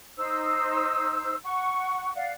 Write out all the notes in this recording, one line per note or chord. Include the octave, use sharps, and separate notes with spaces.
D#4 C5 E6
F#5 C#6
D5 F5 F#5